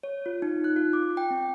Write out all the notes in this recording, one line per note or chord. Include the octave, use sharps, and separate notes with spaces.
C#5
F4
D#4
F#6
F4
D6
G5
C4